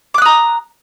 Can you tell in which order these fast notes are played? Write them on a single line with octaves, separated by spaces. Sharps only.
D6 F#6 D#6 A#5